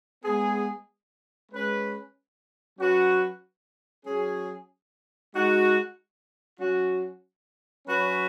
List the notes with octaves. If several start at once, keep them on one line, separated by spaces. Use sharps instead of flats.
G#3 B3 G#4
G#3 C#4 B4
F#3 C#4 F#4 B4
F#3 C#4 G#4
G#3 D#4 F#4
F#3 C#4 F#4
F#3 C#4 F#4 B4